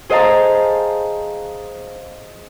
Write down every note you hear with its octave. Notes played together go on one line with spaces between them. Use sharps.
G#4 C5 D#5 F5 A5 A#5